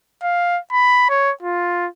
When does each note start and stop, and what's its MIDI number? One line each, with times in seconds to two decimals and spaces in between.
0.23 0.59 77
0.72 1.05 83
1.09 1.32 73
1.43 1.88 65